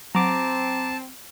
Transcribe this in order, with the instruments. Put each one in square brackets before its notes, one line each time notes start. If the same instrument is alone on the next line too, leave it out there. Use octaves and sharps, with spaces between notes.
[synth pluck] F#3 [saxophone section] C4 [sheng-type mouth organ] A5 [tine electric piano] A#5 D6